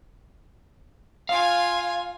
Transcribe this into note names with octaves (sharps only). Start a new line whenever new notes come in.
F4 F5 G#5